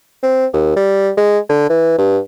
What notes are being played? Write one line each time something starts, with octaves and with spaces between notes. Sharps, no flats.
C4
D#2
G3
G#3
D3
E3
G2